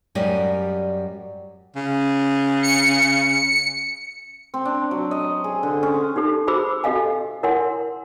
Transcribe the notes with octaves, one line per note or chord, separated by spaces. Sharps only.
F#2 G3 G4 D5 D#5
C#3
C#7
C4
D4
F#3
D#5
G#4
D3
C#4
D#4 G4 A4
F#4 G#4 C5 B5 D6 E6
F#4 G4 A4 D#5 F5 G#5
E4 A#4 C#5 F#5 G#5 C6